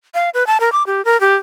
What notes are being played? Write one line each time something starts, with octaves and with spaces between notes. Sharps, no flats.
F5
B4
A5
A#4
D6
G4
A#4
G4